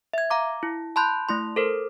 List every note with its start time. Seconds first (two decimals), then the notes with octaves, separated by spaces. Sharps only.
0.13 E5 G#6
0.30 F5 A#5 D6
0.63 E4
0.96 A5 B5 C6 F#6 G6
1.29 A3 E4 C6
1.56 A4 A#4 C5